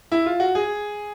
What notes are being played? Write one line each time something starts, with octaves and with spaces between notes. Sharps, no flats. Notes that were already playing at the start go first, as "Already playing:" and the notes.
E4
F4
F#4
G#4